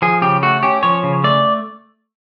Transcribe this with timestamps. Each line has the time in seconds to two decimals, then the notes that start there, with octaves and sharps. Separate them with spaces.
0.02 F3 G#4
0.22 C#3 G4
0.42 A3 F#4
0.63 C#4 G4
0.83 F3 C#5
1.03 C#3
1.24 A3 D5